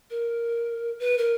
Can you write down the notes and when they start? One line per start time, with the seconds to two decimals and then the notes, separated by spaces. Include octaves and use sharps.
0.10 A#4
1.00 B4
1.18 A#4